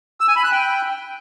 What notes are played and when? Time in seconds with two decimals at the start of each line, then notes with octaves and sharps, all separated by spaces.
0.20 E6
0.28 G#5
0.36 B5
0.44 F#6
0.52 G5